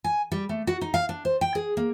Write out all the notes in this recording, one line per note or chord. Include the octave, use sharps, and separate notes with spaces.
G#5
G3
A3
F#4
D#4
F5
D4
C5
G5
G#4
A#3